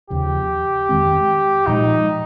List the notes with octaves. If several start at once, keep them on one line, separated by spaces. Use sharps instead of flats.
D#2 C#3 F3 G4
F2 D#3 G#3 C4
A#2 F3 G#3 D#4